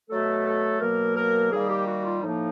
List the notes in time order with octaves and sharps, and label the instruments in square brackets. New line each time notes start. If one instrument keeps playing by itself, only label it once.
[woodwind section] B2 F#3 A3 A4
A4
B2 F#3 A#3 A#4
A#4
D#3 G3 A#3 G#4
G4
F#4
F4
A2 F3 A#3 D#4